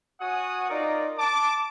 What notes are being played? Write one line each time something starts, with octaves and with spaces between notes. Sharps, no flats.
F#4 C#5 F#5 G#5 D#6
D#4 F4 A#4 D5
A5 D6